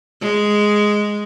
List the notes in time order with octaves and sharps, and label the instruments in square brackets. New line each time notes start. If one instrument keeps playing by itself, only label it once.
[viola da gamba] G#3